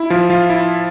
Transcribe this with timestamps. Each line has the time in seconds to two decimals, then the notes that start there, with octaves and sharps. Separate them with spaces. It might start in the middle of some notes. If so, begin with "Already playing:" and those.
Already playing: E4
0.10 F3 F4
0.30 F3 F4
0.50 E4